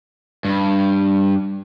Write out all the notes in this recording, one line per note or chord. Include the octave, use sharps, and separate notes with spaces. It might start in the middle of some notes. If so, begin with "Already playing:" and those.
G2